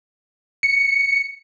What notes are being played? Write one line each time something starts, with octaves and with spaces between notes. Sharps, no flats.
C#7